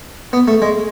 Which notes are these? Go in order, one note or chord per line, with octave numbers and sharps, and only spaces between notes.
B3
A3
G#3